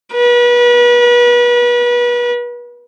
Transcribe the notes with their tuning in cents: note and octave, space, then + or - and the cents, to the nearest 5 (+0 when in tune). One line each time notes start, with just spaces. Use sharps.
B4 -35